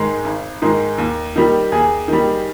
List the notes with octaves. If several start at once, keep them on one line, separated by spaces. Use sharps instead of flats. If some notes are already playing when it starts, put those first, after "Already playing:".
Already playing: G#2 D#3 G#3
G#1
G#2 D#3 G#3
D#2
D#3 G3
D#2 G#4
D#3 G3